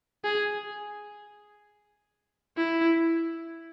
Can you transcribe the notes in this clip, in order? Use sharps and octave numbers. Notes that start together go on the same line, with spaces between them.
G#4
E4